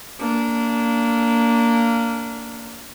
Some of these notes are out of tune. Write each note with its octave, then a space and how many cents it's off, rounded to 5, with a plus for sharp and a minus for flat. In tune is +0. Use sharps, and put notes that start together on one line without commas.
A#3 -15 D4 -20